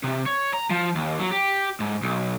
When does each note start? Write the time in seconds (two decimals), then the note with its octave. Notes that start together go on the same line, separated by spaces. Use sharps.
0.04 C3
0.26 C#5
0.54 A#5
0.70 F3
0.95 D#2
1.19 F#3
1.31 G4
1.80 G#2
2.02 B1